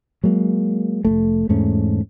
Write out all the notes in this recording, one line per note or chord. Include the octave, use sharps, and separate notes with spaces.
F#3 G#3 A#3
F1 F2 A3
E2 G#2 A3 C#4